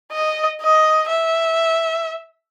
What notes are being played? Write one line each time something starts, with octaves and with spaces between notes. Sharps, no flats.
D#5
D#5
E5